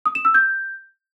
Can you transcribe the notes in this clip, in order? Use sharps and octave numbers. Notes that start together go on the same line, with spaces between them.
D#6
E7
E6
G6